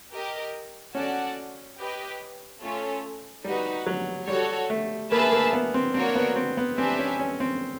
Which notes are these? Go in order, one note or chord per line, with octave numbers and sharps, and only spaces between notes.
G4 A#4 D#5
C#4 F#4 A4 D5 F#5 A5
G4 B4 D#5
A3 C#4 F4 A4 C#5
G3 D#4 F#4 B4
F#3
G3 F#4 A4 C#5
A3
A#3 G#4 B4 E5 A5
A#3
B3
C4
A#3 C4 D4 F#4 A#4 C#5
B3
C4
B3
C4 D4 G4 B4 E5 G#5
C#4
C#4
C4